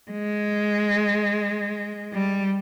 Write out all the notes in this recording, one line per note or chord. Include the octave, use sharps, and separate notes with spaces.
G#3
G3